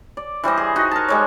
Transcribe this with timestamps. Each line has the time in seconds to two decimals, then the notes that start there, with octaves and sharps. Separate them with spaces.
0.17 D5
0.44 E3 G3 C5 D#5
0.58 G#4
0.76 D#4 F#4
0.91 A#4 A5
1.08 G3 G#3 C#5